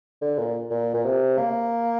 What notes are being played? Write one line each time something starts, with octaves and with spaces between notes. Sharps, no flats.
D3
A#2
A#2
A#2
C3
A#3